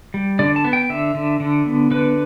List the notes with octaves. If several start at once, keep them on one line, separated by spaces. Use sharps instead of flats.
G3
D3 D5
A5
B3
G5
D3 E5
D3
D3
B3
D3 B4